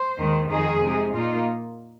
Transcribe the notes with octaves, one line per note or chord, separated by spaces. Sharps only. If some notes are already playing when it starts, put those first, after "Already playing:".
Already playing: C5
D#2 D#3 G#3
F2 D#3 G#3 D#4 G#4
C3 G#3 D#4
A#2 A#3 D#4 F4